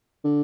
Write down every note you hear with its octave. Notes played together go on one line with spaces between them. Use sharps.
D3